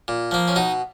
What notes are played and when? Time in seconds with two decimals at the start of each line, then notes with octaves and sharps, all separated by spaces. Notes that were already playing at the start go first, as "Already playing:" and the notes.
0.08 A#2
0.31 F3 A#3
0.48 C#4
0.56 B2 D#4